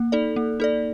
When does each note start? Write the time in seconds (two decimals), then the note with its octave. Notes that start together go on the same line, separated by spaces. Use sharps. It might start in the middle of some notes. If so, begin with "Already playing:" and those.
Already playing: A#3
0.12 D#4 A4 D5
0.36 A#3
0.60 D#4 A4 D5